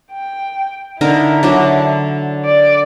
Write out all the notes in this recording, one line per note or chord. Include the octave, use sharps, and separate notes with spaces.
G5
D3 D#4 E4 A#4
D3 F#3 D4
D5